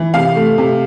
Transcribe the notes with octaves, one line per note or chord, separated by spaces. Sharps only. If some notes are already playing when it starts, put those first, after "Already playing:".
Already playing: E3
C3 F5
A3
C3